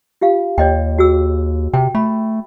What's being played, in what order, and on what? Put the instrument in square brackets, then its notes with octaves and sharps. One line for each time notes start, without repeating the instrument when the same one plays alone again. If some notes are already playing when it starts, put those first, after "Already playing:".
[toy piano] F4 G4 F5
[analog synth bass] D#2 [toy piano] C#5 D#5 G5
[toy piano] F#4 G#4 E6
[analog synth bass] C3 [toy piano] G5
[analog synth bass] A3 [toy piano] B5